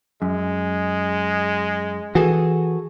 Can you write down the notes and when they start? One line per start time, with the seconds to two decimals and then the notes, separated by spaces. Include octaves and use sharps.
0.22 F#2 G#3
2.15 E3 F#4 G#4 A4